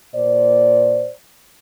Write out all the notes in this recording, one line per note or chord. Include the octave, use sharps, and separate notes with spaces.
A#2 C5 D5